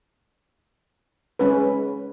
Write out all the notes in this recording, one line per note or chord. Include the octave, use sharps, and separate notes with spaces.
G#3 C#4 B4